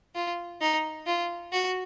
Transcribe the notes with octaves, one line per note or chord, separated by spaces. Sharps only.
F4
D#4
F4
F#4